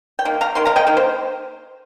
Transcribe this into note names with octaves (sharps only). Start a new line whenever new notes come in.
G5
D#3 A#3
F5 A#5
D#3 G3 A#3 C6
F5 A#5
D#5 G5
D#3 A#3
C5